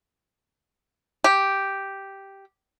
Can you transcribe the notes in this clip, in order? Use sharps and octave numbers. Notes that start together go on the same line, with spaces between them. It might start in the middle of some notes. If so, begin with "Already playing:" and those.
G4